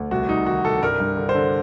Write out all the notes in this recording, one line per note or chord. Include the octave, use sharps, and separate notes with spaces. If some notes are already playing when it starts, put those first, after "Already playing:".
Already playing: D2
C2 F#4
C2 D#4
D#3 F#4
C2 A4
G2 A#4
G2
D3
C5
D3